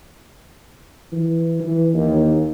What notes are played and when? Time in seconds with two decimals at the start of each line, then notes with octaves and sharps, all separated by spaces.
1.12 E3
1.60 E3
1.93 D#2